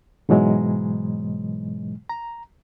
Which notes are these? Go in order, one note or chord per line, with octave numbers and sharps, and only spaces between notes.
G#2 B2 E3 F#3 G#3
A#5